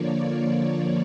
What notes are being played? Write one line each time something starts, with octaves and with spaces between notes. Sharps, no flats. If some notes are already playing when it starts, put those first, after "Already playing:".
Already playing: D3 F3 A#3 C#5 D5